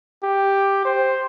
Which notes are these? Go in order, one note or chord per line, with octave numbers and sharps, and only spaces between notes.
G4
C5